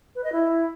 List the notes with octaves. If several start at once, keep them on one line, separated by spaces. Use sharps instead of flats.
B4
D#5
E4